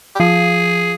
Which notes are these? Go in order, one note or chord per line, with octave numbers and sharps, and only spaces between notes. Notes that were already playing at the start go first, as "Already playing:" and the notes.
G4
F3 G#4